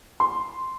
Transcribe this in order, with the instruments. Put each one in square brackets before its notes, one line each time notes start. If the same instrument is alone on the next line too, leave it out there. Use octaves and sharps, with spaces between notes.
[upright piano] C6